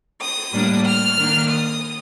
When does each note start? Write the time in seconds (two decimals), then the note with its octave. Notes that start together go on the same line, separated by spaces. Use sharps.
0.21 D#6
0.53 A2 G3 A#3 D4
0.86 F6
1.18 D#3 A#3 D4
1.50 D#6